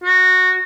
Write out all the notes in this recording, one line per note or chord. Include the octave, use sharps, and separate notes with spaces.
F#4